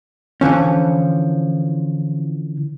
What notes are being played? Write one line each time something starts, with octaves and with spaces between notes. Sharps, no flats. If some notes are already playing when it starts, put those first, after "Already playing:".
D3 E3 F3 C#4